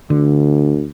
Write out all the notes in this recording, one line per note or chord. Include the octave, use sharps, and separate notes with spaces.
D2 D3